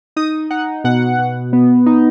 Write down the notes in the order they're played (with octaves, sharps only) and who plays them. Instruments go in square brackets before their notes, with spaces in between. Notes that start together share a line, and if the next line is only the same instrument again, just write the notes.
[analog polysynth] D#4 D#6
D#4 F#5
B2 F#5
B2
B3
D#4